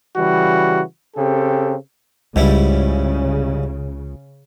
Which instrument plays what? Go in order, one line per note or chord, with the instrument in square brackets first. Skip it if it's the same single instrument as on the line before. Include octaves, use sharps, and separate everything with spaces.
[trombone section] C#3 E3 G3 F#4
C#3 C4 G4 A4
[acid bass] C#2 [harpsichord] G#2 G3 E4 [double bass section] C#3